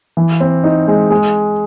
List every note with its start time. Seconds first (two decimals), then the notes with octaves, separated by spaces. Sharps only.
0.17 E3
0.40 C4
0.64 D#4
0.88 G#3
1.10 G#3